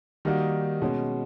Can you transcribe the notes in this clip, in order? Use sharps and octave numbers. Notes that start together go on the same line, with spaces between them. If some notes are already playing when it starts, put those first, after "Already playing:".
D#3 G3 A#3 D#4 F#4
B2 G#3 C#4